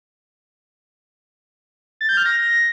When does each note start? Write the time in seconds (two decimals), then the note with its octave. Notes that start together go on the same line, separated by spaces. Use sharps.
2.01 A6
2.09 G6
2.17 F6
2.26 A#6